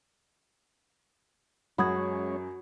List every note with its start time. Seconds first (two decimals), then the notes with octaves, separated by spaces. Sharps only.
1.78 F#2 G#3 C#4 F#4 C#5 B5 D#6 G#6